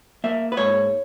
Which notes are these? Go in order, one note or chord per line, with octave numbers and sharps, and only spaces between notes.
A#3 E5
B4
G#2 C#5